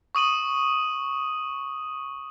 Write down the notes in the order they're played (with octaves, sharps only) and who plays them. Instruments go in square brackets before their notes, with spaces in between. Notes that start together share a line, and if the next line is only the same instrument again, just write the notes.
[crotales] C#6 D#6 D#7 F#7